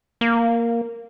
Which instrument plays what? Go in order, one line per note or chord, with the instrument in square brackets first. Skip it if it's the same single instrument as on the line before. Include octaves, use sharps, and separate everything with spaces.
[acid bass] A#3